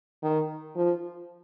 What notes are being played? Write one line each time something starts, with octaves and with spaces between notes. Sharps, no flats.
D#3
F3